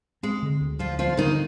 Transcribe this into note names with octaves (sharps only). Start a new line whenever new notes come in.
G#3 C4
D3
D2
F3 G3 F4
F3 G3 F4
D3 D#3 D#4